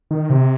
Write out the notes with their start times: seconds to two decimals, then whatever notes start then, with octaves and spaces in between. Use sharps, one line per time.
0.11 D#3
0.30 C3